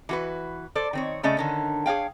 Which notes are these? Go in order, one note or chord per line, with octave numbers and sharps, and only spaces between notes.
E3 F#4 B4
A4 C5 D5
D#3 C4 C#5
C#3 A3 C#4 D5 D#5
D3 D#3 C#4
G#4 C#5 F5 G5